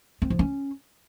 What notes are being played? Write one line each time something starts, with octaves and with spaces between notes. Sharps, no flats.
C4
F3
C#4